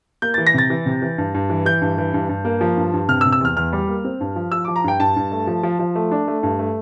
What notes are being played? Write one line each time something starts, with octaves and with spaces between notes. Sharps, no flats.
A#3 G6
E3 A6
A#6
C3 A6
E3
C3
E3
G2
G2
E3
E3 G6
G2
E3
G2
G2
A#3
F3
G2
G2
C3 F6
E6
C3
E6
E2 F6
E2 F6
G3
A#3
C4
G2
F3
F3 E6
F3 D6
A#5
G2 G5
G2 A5
G2
A3
F3
F3
F3
A3
D4
A3
G2
A3